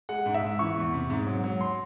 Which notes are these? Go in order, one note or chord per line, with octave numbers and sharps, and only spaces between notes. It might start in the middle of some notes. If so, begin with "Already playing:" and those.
G#3 F#5
G#2
E5
G#2
E3 C#6
E2
C3
G#2
F#3
F#3
C6